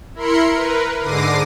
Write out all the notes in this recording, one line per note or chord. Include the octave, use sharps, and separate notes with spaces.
E4 A#4 B5 C6 C#7
A#4 B4
G#2 D3 D6 A#6 C7 D#7